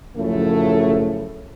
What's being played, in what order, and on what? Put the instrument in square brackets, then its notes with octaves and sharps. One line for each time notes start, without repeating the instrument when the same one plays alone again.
[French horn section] F#2 A2 C#3 F3 A3